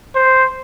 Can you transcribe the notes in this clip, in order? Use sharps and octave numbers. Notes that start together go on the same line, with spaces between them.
C5